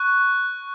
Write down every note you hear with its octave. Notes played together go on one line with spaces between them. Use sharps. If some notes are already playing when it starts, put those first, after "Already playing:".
Already playing: C#6 F#6